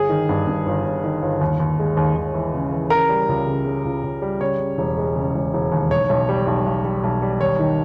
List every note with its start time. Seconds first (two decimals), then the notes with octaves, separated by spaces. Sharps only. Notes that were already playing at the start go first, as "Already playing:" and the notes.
Already playing: G1 G#4
0.09 D#3
0.29 G2
0.47 G2
0.66 G1
0.85 G1
1.04 D#3
1.22 G1
1.41 D#2
1.60 D#2
1.79 G#3
1.97 D#2
2.16 D#2
2.34 E3
2.54 C#3
2.72 E3
2.90 C#3 A#4
3.09 G3
3.29 C#2
3.47 C#3
3.65 C#3
3.85 C#2
4.03 C#2
4.22 G3
4.41 C#3 C#5
4.59 C#3
4.78 E1
4.98 G#3
5.16 C#3
5.35 E1
5.54 E1
5.72 D#2
5.91 B1 C#5
6.09 B1
6.29 G3
6.47 B1
6.66 B1
6.85 G3
7.03 B1
7.22 G3
7.40 D#2 C#5
7.59 D#3